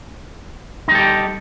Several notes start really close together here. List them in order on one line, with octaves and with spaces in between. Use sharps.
D#4 G3 A4 G4